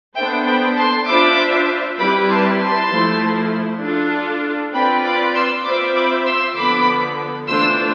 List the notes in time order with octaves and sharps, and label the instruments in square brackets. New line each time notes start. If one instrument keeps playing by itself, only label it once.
[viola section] B3 D4 A4 C5 [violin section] E5 G5
[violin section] G5 B5
A5 C6
[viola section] D4 F4 C5 E5 [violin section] B5 D6
[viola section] G3 C4 E4 G4 B4 [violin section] B5 D6
[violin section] A5 C6
A5 C6
[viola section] F3 A3 E4
D4 F4 A4
[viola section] C4 F4 B4 D5 [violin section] G5 B5
[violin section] B5 D6
C6 E6
[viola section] C4 F4 C5 E5 [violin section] B5 D6
[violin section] B5 D6
C6 E6
[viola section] D3 F3 B3 [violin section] B5 D6
[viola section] E3 A3 D4 F4 C5 [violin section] C6 E6